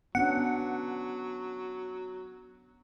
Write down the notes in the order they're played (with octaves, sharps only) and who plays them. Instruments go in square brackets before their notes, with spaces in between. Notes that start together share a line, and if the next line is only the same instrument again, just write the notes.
[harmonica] F#3 [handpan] B3 C#4 D4 [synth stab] F#5